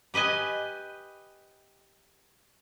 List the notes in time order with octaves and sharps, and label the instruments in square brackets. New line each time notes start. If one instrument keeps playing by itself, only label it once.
[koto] G4 B4 D#5 G#5